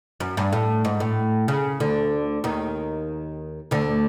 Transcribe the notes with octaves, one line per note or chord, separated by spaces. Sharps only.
F#2
G2
A2
G#2
A2
C#3
D2 D3
D#2 D#3
D2 D3